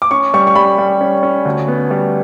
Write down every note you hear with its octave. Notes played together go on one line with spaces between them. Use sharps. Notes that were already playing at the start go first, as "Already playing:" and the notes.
D6
C#4 C#6
G3 C#6
C#6
G3 B5
G3
C#4
C#4
D2
B3
G3